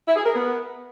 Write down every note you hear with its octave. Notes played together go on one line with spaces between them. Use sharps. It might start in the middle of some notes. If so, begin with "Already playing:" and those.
E4
G#4
A#4
B3